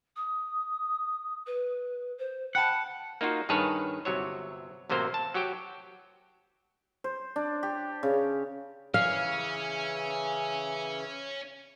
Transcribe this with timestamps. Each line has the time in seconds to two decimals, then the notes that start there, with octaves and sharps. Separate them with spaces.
0.16 D#6
1.46 B4
2.18 C5
2.55 F#5 G5 A5 B5
3.21 A#3 D#4 F4 F#4
3.49 G2 D#3 G#4 B4 C#5 A5
4.05 G1 C3 F#3 C#5
4.89 A1 C3 F#3 A#3 C5
5.14 A5
5.34 F#3 F#4 G4 G5
7.04 C5
7.36 D4
7.63 G4
8.03 C#3
8.94 C#3 E3 C#4 F5